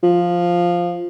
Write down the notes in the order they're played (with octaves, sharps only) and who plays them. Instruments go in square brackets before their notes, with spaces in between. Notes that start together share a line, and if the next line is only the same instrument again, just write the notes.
[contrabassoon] F3